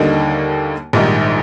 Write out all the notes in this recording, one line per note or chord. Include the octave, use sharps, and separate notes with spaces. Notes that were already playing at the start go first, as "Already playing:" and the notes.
Already playing: D#2 D3 G3 A#3 D#4
A#1 G#2 D#3 G3